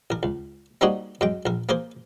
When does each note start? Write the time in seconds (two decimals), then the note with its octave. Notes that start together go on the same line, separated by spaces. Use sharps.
0.10 A1 A#4
0.23 C#2
0.81 G3 A#3 C4 D#4 F#4 G#4
1.21 F#2 G#3 G5
1.46 A#1 A#4
1.69 A#3 G#4 A#4 C5